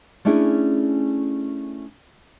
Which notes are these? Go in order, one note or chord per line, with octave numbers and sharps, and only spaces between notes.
A3 C#4 D4 E4 G#4